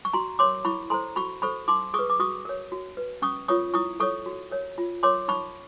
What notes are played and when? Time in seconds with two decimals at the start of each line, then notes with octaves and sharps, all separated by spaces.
0.05 C#6
0.13 F#4 A#5 C6
0.39 A#4 C#5 C6 D6
0.65 E4 B5 C#6
0.90 A4 C5 A#5 C6
1.16 F#4 B5 C#6
1.42 A4 C5 B5 C#6
1.68 D#4 C6 D6
1.94 G#4 C#6 D#6
1.99 B4
2.10 D6
2.19 F#4 C#6 D#6
2.45 A#4 C#5
2.72 F#4
2.97 B4
3.22 C#4 C#6 D#6
3.48 F4 A#4 C#5 C#6 D#6
3.74 E4 C#6 D#6
4.00 A4 C#5 C#6 D#6
4.26 F#4
4.51 A#4 C#5
4.78 F4
5.03 A#4 C#5 C6 D6
5.28 D#4 B5 C#6